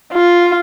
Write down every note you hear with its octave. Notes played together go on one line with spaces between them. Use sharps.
F4